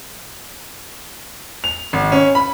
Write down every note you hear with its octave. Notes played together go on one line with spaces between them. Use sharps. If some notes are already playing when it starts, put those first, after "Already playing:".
F7
G#1
C#4
B5